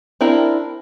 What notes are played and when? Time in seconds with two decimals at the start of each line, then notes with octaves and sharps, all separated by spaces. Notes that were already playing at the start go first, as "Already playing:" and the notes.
0.21 C4 D4 E4 A#4